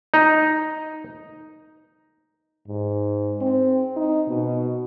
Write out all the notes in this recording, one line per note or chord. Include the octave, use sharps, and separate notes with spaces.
D#4
G#2
C4
D#4
B2